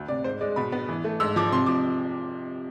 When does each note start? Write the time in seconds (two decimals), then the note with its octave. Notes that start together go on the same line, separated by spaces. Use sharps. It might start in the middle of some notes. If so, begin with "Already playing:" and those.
Already playing: D2
0.08 C3 D5
0.24 G#2 C5
0.41 G#3 D5
0.56 B2 B5
0.72 B3
0.89 E3
1.04 A3
1.20 G#2 E6
1.36 F3 D6
1.52 C3 C6
1.66 F3 D6